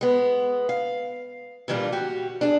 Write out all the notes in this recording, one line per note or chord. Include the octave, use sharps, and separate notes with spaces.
G#3 B3
F5
A#2 D3 E3 G3 F4
F#4 G4
D4 G#4